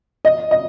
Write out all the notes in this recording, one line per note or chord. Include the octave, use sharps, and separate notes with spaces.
D#5
D#5